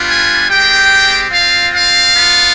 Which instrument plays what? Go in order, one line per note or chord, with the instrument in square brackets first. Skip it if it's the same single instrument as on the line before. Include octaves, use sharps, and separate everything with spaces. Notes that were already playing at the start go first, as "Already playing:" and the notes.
Already playing: [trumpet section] G3 B3 D4 F4
G#5
G#3 C4 G4 G5
C4 F4 F5
F5
B3 F4